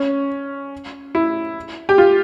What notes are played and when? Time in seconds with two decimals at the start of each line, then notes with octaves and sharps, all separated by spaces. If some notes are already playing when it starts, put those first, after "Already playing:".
Already playing: C#4
1.15 E4
1.89 G4
1.98 F4